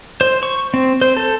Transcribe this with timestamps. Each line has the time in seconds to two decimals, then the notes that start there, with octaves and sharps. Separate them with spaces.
0.21 C5
0.43 C#6
0.74 C4
1.01 C5
1.17 A4